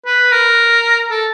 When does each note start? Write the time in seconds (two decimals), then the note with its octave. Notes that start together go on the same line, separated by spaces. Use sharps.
0.06 B4
0.32 A#4
1.11 A4